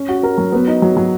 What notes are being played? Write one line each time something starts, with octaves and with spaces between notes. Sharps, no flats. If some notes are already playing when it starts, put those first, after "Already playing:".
Already playing: C#4
F#4
A#4
F#3
B3
D#4
F#3
F#3